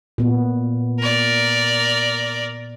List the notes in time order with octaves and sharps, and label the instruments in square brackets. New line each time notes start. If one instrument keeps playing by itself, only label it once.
[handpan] A#2 B3
[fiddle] A#4 D5